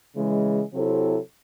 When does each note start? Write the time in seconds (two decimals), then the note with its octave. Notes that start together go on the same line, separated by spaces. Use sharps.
0.16 C#3 E3 G#3
0.73 C3 F#3 C4 E4 A4